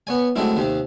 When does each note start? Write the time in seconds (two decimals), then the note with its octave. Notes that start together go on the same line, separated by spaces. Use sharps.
0.07 B3 C#5 G#5
0.36 F#3 G#3 A3 C4 C#4 E4
0.57 D#2 C3 C4